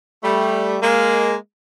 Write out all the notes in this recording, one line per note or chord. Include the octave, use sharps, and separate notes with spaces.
G3 A3
G#3 A#3